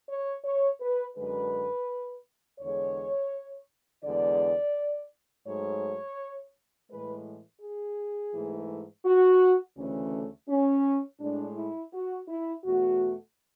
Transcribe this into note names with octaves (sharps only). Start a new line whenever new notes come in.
C#5
C#5
B4
F#2 D3 G#3 B4
E2 D3 G#3 C#5
E2 D3 G#3 D5
G#2 F#3 A3 C#5
A2 E3 G#3 B4
G#4
G#2 E3 A3
F#4
D2 C#3 E3 A3 C#4
C#4
A2 G#3 D4
E4
F#4
E4
E2 B2 A3 F#4